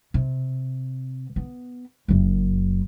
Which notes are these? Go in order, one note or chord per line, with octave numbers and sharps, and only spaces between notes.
C3
B3
F#1 F#2